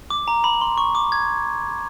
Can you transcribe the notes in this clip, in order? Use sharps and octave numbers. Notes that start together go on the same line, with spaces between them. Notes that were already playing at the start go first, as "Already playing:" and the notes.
D6
A#5
B5
C6
C#6
D6
G#6